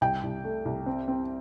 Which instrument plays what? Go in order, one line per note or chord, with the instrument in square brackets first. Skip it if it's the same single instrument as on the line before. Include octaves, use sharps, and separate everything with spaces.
[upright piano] C2 [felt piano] G5
[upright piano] C2
A3
C2
C4
C4